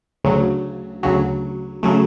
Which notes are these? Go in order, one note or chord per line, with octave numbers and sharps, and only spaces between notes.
D2 C#3 F#3
D2 C#3 F#3
C#3 F#3 A3